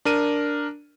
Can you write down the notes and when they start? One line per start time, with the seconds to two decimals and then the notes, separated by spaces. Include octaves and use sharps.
0.05 D4 A#4 D#7